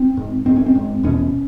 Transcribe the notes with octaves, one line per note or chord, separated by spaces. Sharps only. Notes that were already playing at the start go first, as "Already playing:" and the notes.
Already playing: C4
G#2
G#2 C4
C#4
C4
G#2
E2 B2 C#4